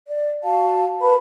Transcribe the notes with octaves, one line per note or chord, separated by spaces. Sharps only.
D5
F#4 F5 A5
A#4 B4 A5 B5